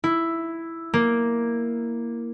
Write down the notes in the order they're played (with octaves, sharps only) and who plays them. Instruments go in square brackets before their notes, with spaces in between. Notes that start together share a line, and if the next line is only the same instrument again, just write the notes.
[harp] E4
A#3